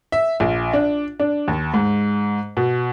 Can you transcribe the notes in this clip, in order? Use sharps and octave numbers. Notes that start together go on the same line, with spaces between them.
E5
A#1
D4
D4
D#2
G#2
B2